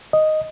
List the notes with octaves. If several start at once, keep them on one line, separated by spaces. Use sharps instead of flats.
D#5